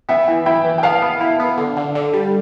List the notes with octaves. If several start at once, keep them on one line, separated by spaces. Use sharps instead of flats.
B3 E5 G5
E3
E4 E5 G5
E3
G5
B3 F5 A5
B3
E4
B3
D3
D3
D3
G3